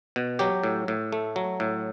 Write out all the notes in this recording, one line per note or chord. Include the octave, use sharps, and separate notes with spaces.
B2
F#3 G4
A2
A2
A3
F#3
A2